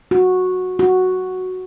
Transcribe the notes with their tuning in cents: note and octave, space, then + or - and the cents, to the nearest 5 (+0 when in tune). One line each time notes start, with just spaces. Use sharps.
F#4 -10
F#4 +0